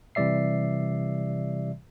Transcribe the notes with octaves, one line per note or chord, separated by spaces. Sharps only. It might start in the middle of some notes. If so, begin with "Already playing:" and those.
C3 E3 G3 D5 E5 C7